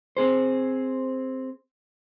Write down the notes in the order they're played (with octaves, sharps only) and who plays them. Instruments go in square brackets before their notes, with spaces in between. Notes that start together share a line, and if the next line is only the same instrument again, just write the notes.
[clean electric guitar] C4 G#4 C5